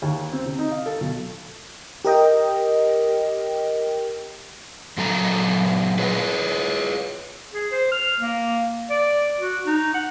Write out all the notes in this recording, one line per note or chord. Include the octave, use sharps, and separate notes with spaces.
D#2
C4
C3
D#4
F5
A4
B1
G4 A#4 D#5 G5
A#2 F#3 A4 A5 A#5
G#4 B4 C#5
G#4
C5
F6
A#3
D5
F#4
D#4
F#5